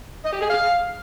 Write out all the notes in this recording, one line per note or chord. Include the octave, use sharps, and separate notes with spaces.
D#5
G4
G#4
F5